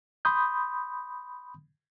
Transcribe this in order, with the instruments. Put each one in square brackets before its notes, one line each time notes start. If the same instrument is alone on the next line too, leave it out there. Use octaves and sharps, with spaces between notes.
[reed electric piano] B5 C6 D#6 G6